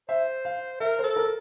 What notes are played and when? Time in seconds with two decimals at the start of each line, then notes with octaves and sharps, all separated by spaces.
0.09 C5 E5
0.45 F5
0.80 A#4 E5
0.99 C5
1.04 A4
1.16 A#4